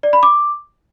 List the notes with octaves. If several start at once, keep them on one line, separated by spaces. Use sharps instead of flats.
D5
B5
D6